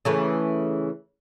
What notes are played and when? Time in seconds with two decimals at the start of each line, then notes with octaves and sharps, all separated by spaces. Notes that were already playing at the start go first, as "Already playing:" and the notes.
0.05 C#3 E3 A3